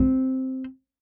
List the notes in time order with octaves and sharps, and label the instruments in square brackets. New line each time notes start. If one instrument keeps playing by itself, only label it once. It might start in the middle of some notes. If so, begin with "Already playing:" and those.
Already playing: [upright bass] C4